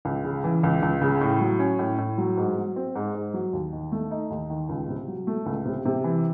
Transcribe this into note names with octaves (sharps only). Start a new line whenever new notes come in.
C#2
C#3
E3
C#2
C#2
C#3
A2
F#3
C#4
A2
A2
F#3
G#2
F#3
C4
G#2
G#2
F#3
D#2
D#3
A3
D#4
D#2
D#3
C#2
C3
F#3
A3
C#2
C3
C3
E3